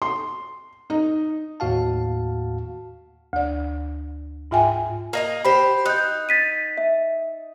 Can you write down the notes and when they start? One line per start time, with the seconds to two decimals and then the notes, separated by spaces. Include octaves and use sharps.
0.02 C6
0.90 D#4
1.60 D#2 A2 F#4 F5 A5
3.33 D2 D5
4.51 G#2 F4 E5 G5 G#5
5.13 A#3 D#5 A#5
5.45 G4 C5 B5
5.86 D#4 F#6 G6
6.29 A6 B6 D#7
6.77 E5